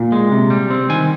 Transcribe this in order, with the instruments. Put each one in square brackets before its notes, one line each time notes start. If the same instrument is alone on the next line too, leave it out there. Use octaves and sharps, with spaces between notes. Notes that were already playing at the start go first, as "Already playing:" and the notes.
Already playing: [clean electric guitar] A#2
G#3
C3
G3
C4
D#3 G#5